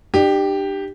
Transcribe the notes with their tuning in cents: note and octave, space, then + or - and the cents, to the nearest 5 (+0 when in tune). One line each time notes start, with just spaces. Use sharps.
D4 +40 G4 +0